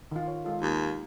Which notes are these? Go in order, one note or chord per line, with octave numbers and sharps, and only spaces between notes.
D#3 F4
C#5
G#3 F4 A4
D#2